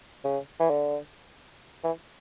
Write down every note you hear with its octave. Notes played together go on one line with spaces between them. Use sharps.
C#3
E3
D3
E3